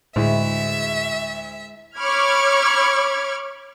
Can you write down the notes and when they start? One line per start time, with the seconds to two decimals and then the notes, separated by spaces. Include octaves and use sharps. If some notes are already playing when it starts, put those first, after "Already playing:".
0.16 D2 A2 G#3 E4 E5
1.97 C#5 B5 C#6 D6 F6 G#6